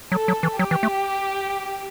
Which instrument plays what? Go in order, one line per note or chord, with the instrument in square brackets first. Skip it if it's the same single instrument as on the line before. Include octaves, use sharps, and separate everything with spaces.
[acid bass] F#3 [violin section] A4
[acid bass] F#3
E3
[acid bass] F#3 [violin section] G4
[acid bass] E3
A3